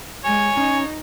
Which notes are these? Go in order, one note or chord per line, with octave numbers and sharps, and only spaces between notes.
G#3 C#5 G#5
C#4 D#4